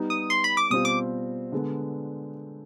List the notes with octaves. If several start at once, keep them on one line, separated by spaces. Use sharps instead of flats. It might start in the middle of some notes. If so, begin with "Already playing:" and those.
Already playing: G3 B3 D#4
D#6
C6
B5
D6
B2 G3 C4 F4 D#6
D6
D3 G#3 B3